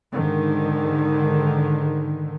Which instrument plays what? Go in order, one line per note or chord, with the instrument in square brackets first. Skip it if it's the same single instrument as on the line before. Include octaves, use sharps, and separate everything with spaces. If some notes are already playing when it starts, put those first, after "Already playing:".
[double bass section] G#2 D3 D#3